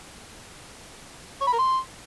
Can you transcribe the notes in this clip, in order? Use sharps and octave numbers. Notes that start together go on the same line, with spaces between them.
C#5
B5
A#4
C6